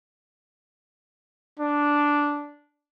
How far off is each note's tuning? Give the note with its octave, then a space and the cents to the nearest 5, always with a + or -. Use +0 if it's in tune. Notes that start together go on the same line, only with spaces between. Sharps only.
D4 -5